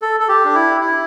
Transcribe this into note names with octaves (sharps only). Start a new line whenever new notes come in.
A4
A4
G4
D4
E4
E4